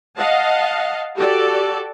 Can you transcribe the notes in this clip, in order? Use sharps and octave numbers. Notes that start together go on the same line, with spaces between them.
D#5 F5 F#5 A5
F#4 G4 A4 D5